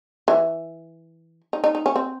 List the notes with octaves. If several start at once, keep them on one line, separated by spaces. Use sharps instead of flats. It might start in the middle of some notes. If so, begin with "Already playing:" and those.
E3
D#4
D#4
D#4
C#4
C4